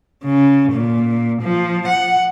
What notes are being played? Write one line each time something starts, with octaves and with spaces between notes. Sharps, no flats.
C#3
A#2
F3
F#5